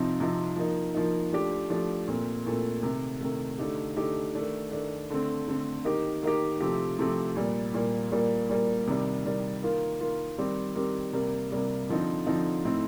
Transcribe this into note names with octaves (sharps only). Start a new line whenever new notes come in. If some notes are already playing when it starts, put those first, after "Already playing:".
Already playing: C3 F3 C4 D#4
C3 F3 C4 D#4
F3 A#3 D#4
F3 A#3 D#4
F3 A3 D4 G4
F3 A3 D4 G4
A#2 A3 C4
A#2 A3 C4
C3 D#3 A3
C3 D#3 A3
D3 A3 D#4 G4
D3 A3 D#4 G4
D#3 A3 D4
D#3 A3 D4
D3 A3 C4
D3 A3 C4
D#3 A#3 D#4 G4
D#3 A#3 D#4 G4
C3 F3 A3 C4 G4
C3 F3 A3 C4 G4
A#2 G3 A#3
A#2 G3 A#3
A#2 G3 A#3
A#2 G3 A#3
C3 D#3 G3
C3 D#3 G3
D#3 A#3 F4
D#3 A#3 F4
D#3 G3 C4 G4
D#3 G3 C4 G4
C3 G3 A#3
C3 G3 A#3
D3 F3 C4 D#4
D3 F3 C4 D#4
A2 A3 C4 D#4